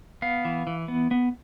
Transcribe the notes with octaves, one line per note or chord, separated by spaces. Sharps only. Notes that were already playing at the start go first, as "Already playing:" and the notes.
B3 F5
E3
E3
B3
B3